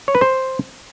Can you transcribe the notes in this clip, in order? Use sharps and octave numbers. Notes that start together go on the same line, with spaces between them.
C#5
B4
C5